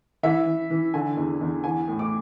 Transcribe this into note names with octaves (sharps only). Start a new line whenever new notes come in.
E3 E5
E3
E3
D3 G#5
E2
E2
E3 G#5
A2
D6